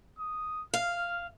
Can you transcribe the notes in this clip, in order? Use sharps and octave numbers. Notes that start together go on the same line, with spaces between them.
D#6
F5 F6